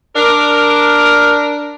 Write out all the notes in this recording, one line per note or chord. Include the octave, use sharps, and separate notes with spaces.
D4 A#4